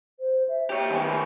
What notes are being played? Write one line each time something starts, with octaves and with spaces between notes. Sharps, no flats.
C5
E5
G4 C#5
D#3 B3 G#5